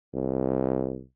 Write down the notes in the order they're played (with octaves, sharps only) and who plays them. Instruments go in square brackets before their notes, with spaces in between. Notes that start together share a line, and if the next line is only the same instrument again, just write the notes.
[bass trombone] C2